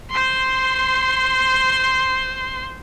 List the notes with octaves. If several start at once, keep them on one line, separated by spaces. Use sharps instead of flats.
C5 C6